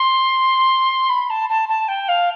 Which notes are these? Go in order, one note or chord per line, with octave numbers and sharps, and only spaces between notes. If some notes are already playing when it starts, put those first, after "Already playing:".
Already playing: C6
B5
A5
A5
A5
G5
F5